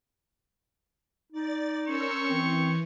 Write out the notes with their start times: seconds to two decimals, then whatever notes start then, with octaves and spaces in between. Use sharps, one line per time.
1.32 D#4 D5 A6
1.86 C#4 A#4 C5 C#5 C#6 E6
2.28 E3 C4